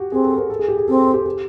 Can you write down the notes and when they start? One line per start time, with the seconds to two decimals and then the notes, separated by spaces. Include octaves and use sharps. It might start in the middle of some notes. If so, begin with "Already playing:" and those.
Already playing: F#4 G4
0.11 C4 G#4
0.24 A4
0.37 A#4
0.50 A4
0.59 G#4
0.68 G4
0.78 G#4
0.88 C4 A4
1.01 A4
1.14 G4
1.26 G4